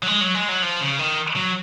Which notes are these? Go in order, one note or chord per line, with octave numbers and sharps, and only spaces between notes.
F#3
G#3
F#3
G#3
F#3
F3
C#3
D#3
F#3